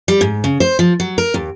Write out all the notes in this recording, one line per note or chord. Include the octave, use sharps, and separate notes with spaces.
G3
G#2
C#3
C5
F3
F#3
A#4
D#2